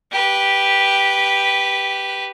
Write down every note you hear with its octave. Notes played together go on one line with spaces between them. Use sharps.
G4 B4